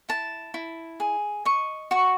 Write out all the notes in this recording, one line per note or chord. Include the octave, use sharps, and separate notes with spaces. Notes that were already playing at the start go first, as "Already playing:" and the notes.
E4 A5
E4
G#4
D#5 C#6
F#4 C#6